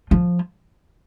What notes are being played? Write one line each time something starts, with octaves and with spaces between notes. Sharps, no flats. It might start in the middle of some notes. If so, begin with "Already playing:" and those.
F3